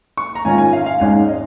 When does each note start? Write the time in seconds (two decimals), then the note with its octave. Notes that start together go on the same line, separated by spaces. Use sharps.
0.17 C#6
0.35 A#5
0.45 G#2 D#3 C#4 F4 G#5
0.58 G#5
0.73 F5
0.86 F5
1.00 G#1 G#2 G#3 C#4 G#5
1.28 D#5